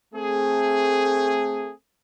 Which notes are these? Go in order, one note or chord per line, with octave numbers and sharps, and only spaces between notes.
A3 C4 G#4